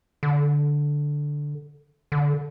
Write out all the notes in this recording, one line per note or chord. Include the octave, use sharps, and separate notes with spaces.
D3
D3